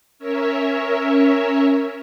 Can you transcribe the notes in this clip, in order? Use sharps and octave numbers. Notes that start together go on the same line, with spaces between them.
C#4 A#4 C#5 E5